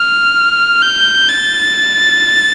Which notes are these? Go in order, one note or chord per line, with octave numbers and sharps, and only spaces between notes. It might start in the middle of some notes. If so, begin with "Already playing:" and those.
Already playing: F6
G6
A6